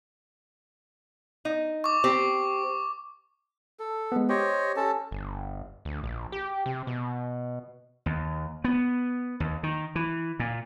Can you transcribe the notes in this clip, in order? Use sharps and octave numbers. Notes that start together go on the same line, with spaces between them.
D#4
C#6 D6
C4 G4 C5
A4
G#3 B3
G4 C5 C#5 D#5
C#4 A4 A5
G1
D2
A#1
G4
C3
B2
D#2
B3
D#2
D#3
E3
A#2